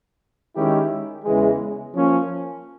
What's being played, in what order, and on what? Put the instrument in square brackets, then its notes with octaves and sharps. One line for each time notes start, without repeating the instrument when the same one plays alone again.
[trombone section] D#3 G#3 C#4 E4 G4
E2 C#3 E3 G#3
F3 A#3 C#4